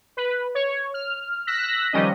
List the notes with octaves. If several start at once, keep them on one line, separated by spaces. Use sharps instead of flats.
B4
C#5
F6
E6 F#6 A#6 B6
D#3 F3 G3 C#4 D#5